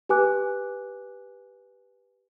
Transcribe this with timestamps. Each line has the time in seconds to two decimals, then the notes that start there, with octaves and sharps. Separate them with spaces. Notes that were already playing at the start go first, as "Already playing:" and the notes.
0.09 G4 B4 G#5 D6 F#6